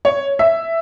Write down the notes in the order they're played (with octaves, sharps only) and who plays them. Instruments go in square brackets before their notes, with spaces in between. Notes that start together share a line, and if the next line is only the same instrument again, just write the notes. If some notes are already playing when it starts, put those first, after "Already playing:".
[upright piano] C#5
E5